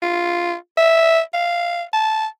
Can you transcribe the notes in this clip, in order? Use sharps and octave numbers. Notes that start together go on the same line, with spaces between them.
F4
E5
F5
A5